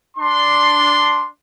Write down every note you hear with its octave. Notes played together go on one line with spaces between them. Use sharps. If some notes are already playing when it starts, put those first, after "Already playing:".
D4 C6